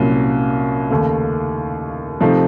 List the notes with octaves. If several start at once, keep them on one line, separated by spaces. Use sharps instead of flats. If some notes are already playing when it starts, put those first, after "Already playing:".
Already playing: C2 A#2 F#3 A#3 C#4
D#2 C#3 A3
C3 F3 A3 D#4